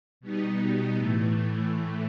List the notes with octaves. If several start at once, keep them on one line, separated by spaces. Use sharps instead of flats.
B2 G3 B3 D#4
A2 E3 A3